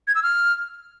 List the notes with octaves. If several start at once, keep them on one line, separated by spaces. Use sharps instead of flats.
G#6
E6
F6